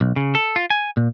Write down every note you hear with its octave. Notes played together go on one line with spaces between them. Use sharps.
B1
C#3
A4
F4
G#5
A#2